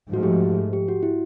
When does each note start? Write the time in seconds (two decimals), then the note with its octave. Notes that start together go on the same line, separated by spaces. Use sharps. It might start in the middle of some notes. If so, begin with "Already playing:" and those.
0.13 G#2 F3 A3 F#4
0.23 G4
0.73 G4
0.88 F#4
1.03 E4